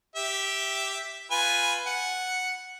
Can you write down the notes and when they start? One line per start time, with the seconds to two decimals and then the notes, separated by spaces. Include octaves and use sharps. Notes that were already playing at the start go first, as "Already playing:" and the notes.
0.16 G4 E5
1.31 F4 B4 G#5
1.87 F#5